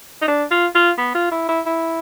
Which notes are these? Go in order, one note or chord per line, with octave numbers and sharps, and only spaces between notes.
D#4
D4
F4
F4
B3
F4
E4
E4
E4